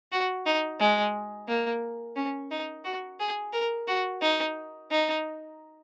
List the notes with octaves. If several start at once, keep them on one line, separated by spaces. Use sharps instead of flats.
F#4
D#4
G#3
A#3
C#4
D#4
F#4
G#4
A#4
F#4
D#4
D#4